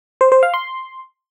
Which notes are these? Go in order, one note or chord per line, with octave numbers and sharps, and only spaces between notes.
C5
C5
F5
C6